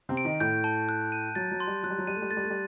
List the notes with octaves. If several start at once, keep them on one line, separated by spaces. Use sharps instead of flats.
C3 C4
D7
D#3 D#4
A2 A3 G6
A5
F#6
D#7
F#3 A6
F#3
C6
G3
F#3 F#6
G3
F#3
G3 D#7
A3
G3
A3 A6
G3
A3
G3